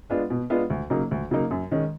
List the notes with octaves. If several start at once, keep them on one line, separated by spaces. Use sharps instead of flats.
G#3 B3 D4 F4
B2
G#3 B3 D4 F4
D2
C#3 F#3 A#3 D#4
D2
C#3 F#3 A#3 D#4
F#2
D#3 G#3 C#4